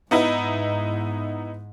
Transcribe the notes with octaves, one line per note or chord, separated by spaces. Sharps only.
G#2 B3 D#4 E4